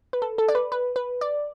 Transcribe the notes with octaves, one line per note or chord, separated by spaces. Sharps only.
B4
A4
A4
D5
B4
B4
B4
D5